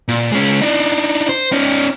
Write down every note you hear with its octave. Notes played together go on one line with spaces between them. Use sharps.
A#2
G#3 C#4
D4 D#4
C5
C#4 D#4